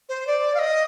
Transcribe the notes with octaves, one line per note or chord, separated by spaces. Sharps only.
C5
D5
F5
D#5